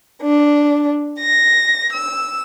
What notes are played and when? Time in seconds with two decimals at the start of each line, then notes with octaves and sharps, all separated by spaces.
0.21 D4
1.19 A#6
1.92 E6